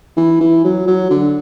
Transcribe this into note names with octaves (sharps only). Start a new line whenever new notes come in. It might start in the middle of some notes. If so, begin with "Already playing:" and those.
E3
E3
F#3
F#3
D3